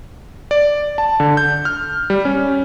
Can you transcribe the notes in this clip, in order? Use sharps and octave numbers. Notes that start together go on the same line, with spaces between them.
D5
A5
D3
G6
F6
G3
C#4